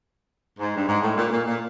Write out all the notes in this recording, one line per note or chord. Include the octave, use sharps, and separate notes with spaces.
G#2
G2
G#2
A2
A#2
A#2
A#2